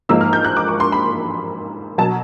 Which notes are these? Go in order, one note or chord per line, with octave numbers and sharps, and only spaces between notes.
G#2 F3 A#3 D#4 E6
F6
G6
F#6
D6
C#6
C6
B5
B2 F#3 A5